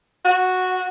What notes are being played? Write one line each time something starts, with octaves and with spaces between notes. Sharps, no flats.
F#4